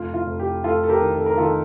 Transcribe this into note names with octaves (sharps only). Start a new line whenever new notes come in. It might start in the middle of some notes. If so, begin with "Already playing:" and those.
Already playing: F1 F4
F4
F1
G4
F1 F4 A4
A4
G4 A#4
D#3
A4
A#4
D#3 F4 A4